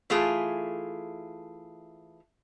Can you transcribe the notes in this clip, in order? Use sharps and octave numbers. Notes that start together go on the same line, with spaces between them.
E3 A3 F4 G#4